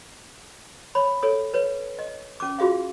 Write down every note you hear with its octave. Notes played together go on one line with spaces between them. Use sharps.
C#5 B5
A4 C#5 D#6
B4 C#5
D#5
C#4 D6
F4 F#4 G#4 E5 F5